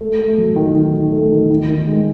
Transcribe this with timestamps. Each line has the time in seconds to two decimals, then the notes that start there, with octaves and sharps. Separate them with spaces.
0.01 A3
0.19 A3
0.38 F#3
0.56 D#3
0.75 D#3
0.94 D#3
1.12 A3
1.32 D#3
1.50 D#3
1.68 D#3
1.87 G#3